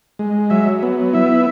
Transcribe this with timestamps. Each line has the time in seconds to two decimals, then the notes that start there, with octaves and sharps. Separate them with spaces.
0.19 G#3
0.50 F#3 E5
0.83 B3
1.13 E4 E5